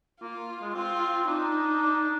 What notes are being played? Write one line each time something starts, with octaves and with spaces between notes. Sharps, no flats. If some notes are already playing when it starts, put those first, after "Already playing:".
A#3 F4
G#3
C4 F4
D4 D#4
D4